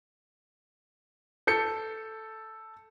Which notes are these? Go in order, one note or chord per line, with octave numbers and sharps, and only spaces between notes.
A4 G6 C#7